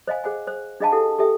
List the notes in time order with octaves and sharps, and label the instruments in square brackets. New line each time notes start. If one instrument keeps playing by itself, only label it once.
[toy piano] C5 D#5 F5 G#5
G#4 C5 F#5 G#5
C5
D4 G#4 D#5 F5 G#5 A5
E4 G4 A4 F#5
G4 A4 E5 G5